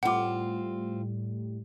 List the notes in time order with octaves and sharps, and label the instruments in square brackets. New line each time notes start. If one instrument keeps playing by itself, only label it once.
[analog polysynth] A2 G3 [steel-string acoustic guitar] C4 F4 [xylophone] F#5 D6